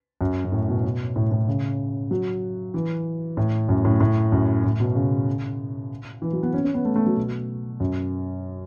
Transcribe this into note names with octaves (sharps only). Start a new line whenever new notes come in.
F#2
F#2
A2
B2
B2
A2
A2
C#3
F#3
E3
A2
F#2
A2
A2
F#2
A2
B2
C#3
E3
F#3
B3
C#4
C#4
B3
A3
A3
F#3
B2
F#2